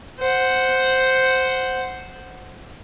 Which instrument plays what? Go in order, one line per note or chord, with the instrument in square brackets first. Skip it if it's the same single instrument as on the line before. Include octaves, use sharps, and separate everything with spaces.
[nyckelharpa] C5 F#5